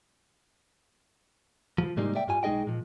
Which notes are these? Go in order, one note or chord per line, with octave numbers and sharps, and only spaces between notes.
F3
G#2 C3 G3 G#3 A#3 D#4
D5 E5 G5
G2 G3 F4 G#5
B1 G#3 D#4 G#4 D#5 G5
A#2 F3